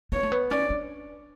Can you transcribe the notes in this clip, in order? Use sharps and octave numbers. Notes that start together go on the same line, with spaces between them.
B3 C#5
A3
B3
C#4 D5
D4